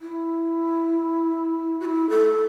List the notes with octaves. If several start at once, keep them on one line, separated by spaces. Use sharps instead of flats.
E4
F#4
E4
A4